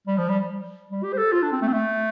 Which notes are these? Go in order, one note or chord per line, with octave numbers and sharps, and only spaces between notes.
G3
F3
G3
G3
G4
C5
A4
F4
D4
C4
A3
C4
A3